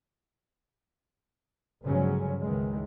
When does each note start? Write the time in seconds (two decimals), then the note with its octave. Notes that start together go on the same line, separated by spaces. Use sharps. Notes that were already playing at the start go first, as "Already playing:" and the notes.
1.83 G1 C#3 F3 F#3 G#3 C#4
2.41 C#2 D#3 E3 G#3